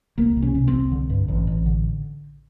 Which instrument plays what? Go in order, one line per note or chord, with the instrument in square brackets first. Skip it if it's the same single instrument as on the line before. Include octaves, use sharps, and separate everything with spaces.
[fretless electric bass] C2 A#3
C3
C#4
C3
C4
C2
D3
G2
A1
A1
D3